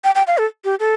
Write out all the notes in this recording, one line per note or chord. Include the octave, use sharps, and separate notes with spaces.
G5
G5
F5
A4
G4
A4